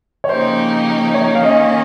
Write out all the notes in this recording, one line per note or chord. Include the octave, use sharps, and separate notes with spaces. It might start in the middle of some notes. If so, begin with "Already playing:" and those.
C#5
C#3 F3 A#3 D#4 G4 C5
C#5
F5
D#3 A#3 C#4 D#5